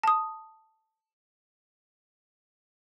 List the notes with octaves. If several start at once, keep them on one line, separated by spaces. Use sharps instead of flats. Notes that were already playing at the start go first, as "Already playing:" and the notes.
A5 D#6